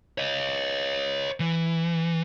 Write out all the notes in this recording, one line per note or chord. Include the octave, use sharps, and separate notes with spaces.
C#5 D#5
E3